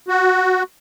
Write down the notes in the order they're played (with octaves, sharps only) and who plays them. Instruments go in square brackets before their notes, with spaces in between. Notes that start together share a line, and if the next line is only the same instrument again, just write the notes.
[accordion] F#4